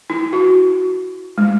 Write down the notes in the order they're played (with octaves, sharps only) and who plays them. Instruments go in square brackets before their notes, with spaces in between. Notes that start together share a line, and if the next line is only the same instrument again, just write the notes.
[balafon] E4
F#4
G#3